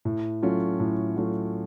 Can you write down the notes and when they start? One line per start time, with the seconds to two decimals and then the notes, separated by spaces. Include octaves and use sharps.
0.05 A2
0.42 F#3 A3 C#4 F4
0.80 A2
1.16 F#3 A3 C#4 F4